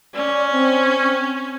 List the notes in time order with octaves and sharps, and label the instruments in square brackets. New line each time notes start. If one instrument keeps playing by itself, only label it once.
[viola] C#4 [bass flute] D5
[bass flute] C4